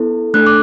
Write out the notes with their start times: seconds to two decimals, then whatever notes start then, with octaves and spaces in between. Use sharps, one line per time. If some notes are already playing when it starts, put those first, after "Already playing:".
Already playing: B3 E4 A4
0.34 A3 D4 A4 F#6
0.47 D6